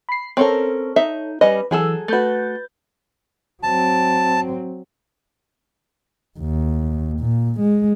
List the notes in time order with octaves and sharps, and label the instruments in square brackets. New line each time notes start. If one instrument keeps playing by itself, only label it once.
[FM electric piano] B5 C7
[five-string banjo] C4 C#4 A#4 [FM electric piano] A4 C#5
[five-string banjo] D#4 E5
[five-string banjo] G3 C#4 D#5 [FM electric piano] B4
[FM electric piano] E3 E6 [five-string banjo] F#3 G#4 A4
[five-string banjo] A3 F#4 [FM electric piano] B4 G6 A6
[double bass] F#3 C4 [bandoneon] A5
[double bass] D#2
A#2
G#3